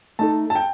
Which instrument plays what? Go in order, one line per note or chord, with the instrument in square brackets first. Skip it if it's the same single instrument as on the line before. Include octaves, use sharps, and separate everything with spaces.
[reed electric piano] A3 D#4 A4 [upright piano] A5
[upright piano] A5
G5